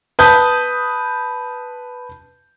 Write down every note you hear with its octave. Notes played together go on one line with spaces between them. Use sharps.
B4 A5 D#6 G6